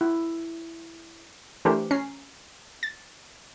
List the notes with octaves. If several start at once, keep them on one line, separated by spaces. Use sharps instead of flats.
E4
E3 A3 D4 G4 A#4 C5
C#4 A#5 C7
A6